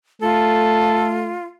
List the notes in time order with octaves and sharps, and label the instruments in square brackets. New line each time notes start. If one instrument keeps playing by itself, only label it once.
[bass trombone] A3 [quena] F4 [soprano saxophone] A4